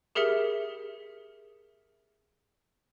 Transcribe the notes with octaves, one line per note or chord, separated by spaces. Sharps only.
G4 G#4 A#4 E5 C#7